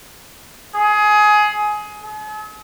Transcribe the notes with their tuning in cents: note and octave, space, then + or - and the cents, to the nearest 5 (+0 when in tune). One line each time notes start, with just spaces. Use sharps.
G#4 +20
G#4 +45